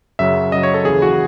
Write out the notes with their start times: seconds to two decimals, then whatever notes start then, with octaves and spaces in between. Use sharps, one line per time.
0.19 F#2 C#3 F#3 E5
0.52 F#2 C#3 F#3 D#5
0.63 C#5
0.74 A4
0.85 D#2 C#3 E3 G#4
1.02 F#4